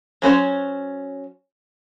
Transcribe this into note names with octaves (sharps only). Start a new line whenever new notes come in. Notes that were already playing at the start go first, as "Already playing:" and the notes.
F#3 C#4 C5 C#5